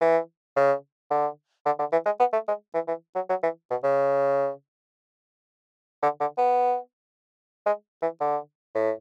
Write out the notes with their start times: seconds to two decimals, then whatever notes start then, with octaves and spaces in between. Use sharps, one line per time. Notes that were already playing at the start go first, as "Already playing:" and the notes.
0.01 E3
0.56 C#3
1.10 D3
1.66 D3
1.79 D3
1.92 E3
2.06 G#3
2.20 B3
2.33 A3
2.48 G#3
2.74 E3
2.88 E3
3.15 F#3
3.29 F#3
3.43 E3
3.71 B2
3.84 C#3
6.03 D3
6.20 D3
6.38 B3
7.66 G#3
8.02 E3
8.21 D3
8.75 A2